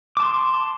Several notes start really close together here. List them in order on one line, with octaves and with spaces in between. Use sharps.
D6 A5 C6